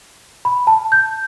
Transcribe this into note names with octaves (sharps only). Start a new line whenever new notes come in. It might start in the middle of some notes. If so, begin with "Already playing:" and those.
B5
A5
G6